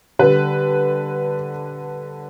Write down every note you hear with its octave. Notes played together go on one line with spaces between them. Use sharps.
D3 G3 B4